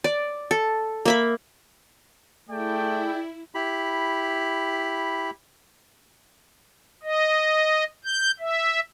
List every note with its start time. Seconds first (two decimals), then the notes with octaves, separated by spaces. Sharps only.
0.04 D5
0.51 A4
1.05 A#3 E5 B5
2.49 A3 E4 G#4 D5 G5
3.55 E4 G4 B5
7.03 D#5
8.05 G6
8.40 E5